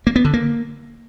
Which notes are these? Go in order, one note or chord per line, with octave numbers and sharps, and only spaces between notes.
A#3
B3
D3
A#3